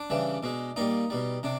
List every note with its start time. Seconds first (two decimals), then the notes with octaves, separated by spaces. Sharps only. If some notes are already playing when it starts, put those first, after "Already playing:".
Already playing: D4
0.10 C#3 E3 G3
0.43 B2 G#3
0.76 A#2 G3 D#4
1.10 B2 G3
1.43 C3 D4